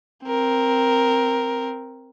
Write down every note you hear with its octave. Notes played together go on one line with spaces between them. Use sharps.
C4 A#4